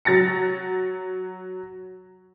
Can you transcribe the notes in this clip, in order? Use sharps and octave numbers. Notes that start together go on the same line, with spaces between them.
F#3 A6 A#6 C#7